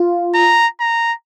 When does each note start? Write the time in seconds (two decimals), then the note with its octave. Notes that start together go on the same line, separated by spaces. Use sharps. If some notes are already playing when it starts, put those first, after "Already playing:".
Already playing: F4
0.35 A#5
0.80 A#5